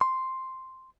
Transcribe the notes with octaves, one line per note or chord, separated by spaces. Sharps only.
C6